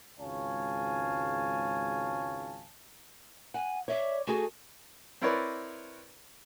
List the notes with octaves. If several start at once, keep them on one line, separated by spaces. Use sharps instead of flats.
G#1 C#2 C#5 F5 G#5 A5
F#5 G#5
C#5 D5 E5
A3 F#4 G#4 A4
C4 E4 A#4 B4 C#5 D5